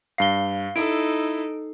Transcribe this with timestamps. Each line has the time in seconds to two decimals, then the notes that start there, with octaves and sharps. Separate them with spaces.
0.18 G2 F5 C7 G7
0.76 D#4 E4 A4 D7